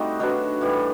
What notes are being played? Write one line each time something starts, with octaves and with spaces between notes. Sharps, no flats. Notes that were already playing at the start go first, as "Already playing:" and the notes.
Already playing: G3 A3 C4 D#4 F#4
D#3 F#3 B3 D4
A2 E3 G3